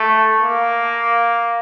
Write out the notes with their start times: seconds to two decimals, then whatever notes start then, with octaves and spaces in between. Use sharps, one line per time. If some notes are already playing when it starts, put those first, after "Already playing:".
Already playing: A3
0.40 A#3